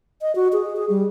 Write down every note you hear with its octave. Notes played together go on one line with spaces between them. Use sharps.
D#5
F#4
G#4
G#4
G3